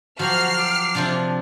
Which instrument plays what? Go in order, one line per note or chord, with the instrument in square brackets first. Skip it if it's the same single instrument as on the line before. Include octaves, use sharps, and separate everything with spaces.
[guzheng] F3 F#3 G4 [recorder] F#4 [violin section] F6 C7
[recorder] D6
[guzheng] C3 F3 D4